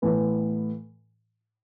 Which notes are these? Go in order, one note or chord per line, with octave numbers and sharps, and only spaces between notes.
A2 E3 B3